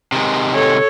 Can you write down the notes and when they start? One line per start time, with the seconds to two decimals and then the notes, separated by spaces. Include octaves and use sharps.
0.12 C3 D#3 G#3
0.54 A4 C#5